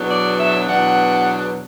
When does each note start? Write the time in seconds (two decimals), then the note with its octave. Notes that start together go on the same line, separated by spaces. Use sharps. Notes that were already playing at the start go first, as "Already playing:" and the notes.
Already playing: E2 B2 F#3 B3 D4
0.11 D5
0.40 E5
0.68 E2 B2 F#3 B3 D4 F#5